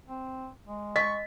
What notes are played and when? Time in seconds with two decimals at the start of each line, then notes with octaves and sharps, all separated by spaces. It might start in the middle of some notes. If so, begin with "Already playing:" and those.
0.07 C4
0.67 G#3
0.96 D#5 C#6 B6